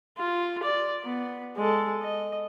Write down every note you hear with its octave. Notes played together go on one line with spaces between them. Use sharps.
F4
D5
B3
G#3 A4
D#5